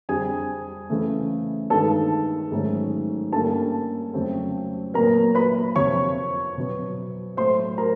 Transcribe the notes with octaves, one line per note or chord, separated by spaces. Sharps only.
F2 D3 G3 G#4 G#5
C#3 E3 A3
G2 D#3 G#3 B3 A4 A5
G#2 D#3 F#3 A3 C#4
G2 D3 G3 A#3 C#4 A4 A5
F2 C#3 F#3 A3 C4
A#2 F#3 B3 A#4 A#5
B4 B5
F2 C3 F3 C#5 C#6
B2 F#3 B3
A2 F#3 A3 C5 C6
A#4 A#5